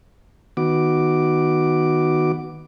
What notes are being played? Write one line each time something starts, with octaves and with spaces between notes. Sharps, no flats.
D#3 B3 F#4 D6